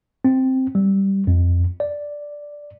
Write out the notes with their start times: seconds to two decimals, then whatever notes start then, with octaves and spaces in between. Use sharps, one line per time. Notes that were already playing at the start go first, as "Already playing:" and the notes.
0.25 C4
0.75 G3
1.27 F2
1.80 D5